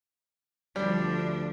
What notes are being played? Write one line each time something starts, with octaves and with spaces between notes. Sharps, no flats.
D2 F3 G3 D4